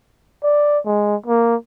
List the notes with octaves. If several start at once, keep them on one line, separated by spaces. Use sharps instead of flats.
D5
G#3
A#3